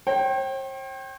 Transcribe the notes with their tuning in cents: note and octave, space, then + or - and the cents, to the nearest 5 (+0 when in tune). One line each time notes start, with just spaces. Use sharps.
C5 +45 G5 -15